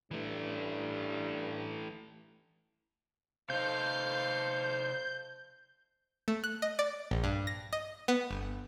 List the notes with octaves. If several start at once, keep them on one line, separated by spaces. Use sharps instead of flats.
G2 E3 A3
C3 D#4 A4 C5 F5 G6
A3
F#6
D#5
D5
A#1
G2
A#6
D#5
B3
G1